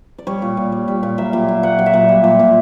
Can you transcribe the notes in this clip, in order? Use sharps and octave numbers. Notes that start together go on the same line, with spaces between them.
D5
G3 C#5
A#2
A#2
G3
G3
A#2
F#3 E5
A#2
A#2
F#3 F#5
F#3
E5
A#2
G3
A#2
A#2